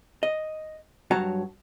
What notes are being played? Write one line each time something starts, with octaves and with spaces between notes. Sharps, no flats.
D#5
G2 F#3 F#4 C#5 A5 A#5